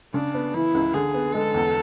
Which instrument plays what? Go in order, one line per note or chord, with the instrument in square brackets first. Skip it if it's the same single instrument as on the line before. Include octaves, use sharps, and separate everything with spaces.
[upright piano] C#3 [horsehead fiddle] D4
[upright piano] B3
[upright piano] E3 [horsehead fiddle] E4
[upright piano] C#2
[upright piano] D3 [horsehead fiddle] G#4
[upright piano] B3
[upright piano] G#3 [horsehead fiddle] A4
[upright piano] E2